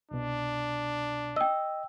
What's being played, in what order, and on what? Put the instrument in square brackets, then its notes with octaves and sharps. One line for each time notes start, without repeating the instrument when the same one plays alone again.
[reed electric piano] C2 B2 [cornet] D4
[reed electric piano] D#5 [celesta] G5 E6